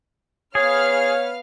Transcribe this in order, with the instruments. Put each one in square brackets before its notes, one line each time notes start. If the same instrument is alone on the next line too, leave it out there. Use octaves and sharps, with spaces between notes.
[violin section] B3 F5 F6 [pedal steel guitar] G#4 [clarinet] C#5